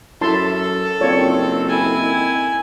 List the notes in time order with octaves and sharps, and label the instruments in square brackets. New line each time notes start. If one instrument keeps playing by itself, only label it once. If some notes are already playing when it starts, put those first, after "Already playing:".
[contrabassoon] F#2 [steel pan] E4 A5 C6 [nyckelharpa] A4
[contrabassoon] F#1 [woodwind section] D#3 C4 [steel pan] F4 C#5 D5
[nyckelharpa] E4 G#5